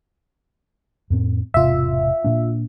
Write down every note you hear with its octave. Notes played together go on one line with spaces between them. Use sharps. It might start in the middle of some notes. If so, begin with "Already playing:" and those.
F2 A2 C4
E1 G#2 C3 F4 E5
A#2 A#3 D4